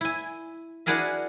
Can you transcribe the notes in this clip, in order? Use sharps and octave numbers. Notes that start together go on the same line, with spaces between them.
E4 G#5
D4 E4 F#4 G#4 A#4 E5